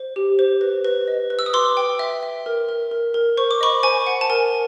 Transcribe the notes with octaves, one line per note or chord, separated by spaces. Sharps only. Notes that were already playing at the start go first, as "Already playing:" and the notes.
Already playing: C5
G4
C5
B4
B4
D#5
B4
E6
D#6
B4 C6 D6
G5
E5
E5
A#4
A#4
A#4
A#4
C5 C#6
D6
D#5 B5 C#6
C5 G#5
F#5
A5
A#4 G#5